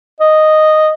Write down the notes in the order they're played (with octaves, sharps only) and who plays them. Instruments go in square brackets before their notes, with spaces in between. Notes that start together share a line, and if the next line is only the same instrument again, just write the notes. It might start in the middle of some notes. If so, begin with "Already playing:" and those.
[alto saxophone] D#5